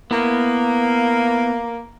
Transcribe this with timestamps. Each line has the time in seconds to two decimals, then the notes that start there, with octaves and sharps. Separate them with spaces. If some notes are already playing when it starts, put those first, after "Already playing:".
0.11 A#3 B3 E4